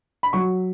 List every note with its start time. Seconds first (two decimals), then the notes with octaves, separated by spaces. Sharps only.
0.23 B5
0.33 F#3 C#6